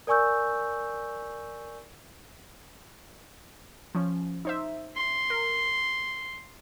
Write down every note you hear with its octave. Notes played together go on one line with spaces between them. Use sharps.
A#4 D5 G#5 C#6 E6 G6
F3 C#4
D#4 C5 E5
C6
A#4